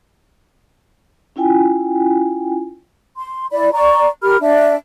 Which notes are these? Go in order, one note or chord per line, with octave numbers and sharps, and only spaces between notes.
C#4 E4 F4 G5 G#5
C6
E4 D5 B5
D5 A#5 C#6
G4 A#4 B5 F6
D4 E5